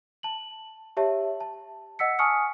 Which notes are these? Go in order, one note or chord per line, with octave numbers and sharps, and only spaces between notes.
A5 F#7
G4 C#5 E5 A5
A5
D#5 F#5 E6 B6 C#7
G#5 A5 C#6 D#6 F6 C#7